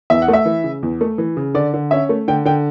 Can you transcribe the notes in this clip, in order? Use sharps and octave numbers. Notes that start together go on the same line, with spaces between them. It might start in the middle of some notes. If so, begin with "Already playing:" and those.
E2 E5
F#5
A3
E5
E3
C#3
E2
A3
E3
C#3
D3 D5
D3
C#4 E5
A3
D3 G5
D3 G5